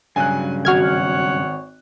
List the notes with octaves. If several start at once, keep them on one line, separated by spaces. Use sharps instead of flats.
G2 C#3 F#3 G#5 F#6
G#1 F#4 C#5 F#5 F6 G#6